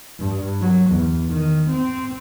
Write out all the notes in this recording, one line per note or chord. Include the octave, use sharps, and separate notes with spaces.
G2
F#3
E2
D#3
C4